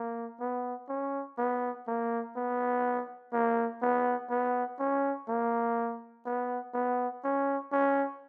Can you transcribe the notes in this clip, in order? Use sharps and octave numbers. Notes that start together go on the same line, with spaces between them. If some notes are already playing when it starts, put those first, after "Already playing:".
Already playing: A#3
B3
C#4
B3
A#3
B3
A#3
B3
B3
C#4
A#3
B3
B3
C#4
C#4